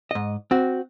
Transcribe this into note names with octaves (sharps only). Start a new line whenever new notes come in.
G#2 D#5
C4 F#4